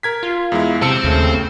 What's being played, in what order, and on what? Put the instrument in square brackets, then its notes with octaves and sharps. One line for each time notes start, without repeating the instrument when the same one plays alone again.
[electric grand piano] A#4 G#6 B6
[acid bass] F4
[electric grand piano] E2 G#3 E4
[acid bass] C3 [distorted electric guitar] C4 [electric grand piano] A5 E6 C#7
[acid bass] D#2 [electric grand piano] C#3 A3